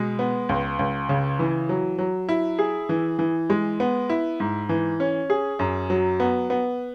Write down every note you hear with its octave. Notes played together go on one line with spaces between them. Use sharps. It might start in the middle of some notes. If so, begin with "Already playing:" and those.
Already playing: B2 G#3
B3
C#2
C#2
C#3
E3
F#3
F#3
E4
G#4
E3
E3
G#3
B3
E4
G#2
E3
C#4
G#4
F#2
F#3
B3
B3